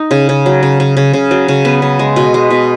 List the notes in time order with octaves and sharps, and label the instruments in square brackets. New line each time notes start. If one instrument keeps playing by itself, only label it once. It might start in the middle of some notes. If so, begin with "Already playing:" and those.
Already playing: [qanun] D#4
C#3
C#3
F#3
C#3
C#3
C#3
C#3
F#3
C#3
B3
C#3
G#3
B2
G#3
B2